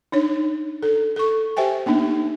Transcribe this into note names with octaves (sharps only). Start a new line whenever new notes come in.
D4 D#4 C#5
A4
A4 C#6
G4 C5 E5 G5 G#5
A#3 B3 D4 D#4